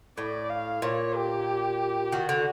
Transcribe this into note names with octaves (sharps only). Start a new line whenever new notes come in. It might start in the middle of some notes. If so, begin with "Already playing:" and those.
A2 D5
F5
A#2 C#5
G4
D#3 F#4
D3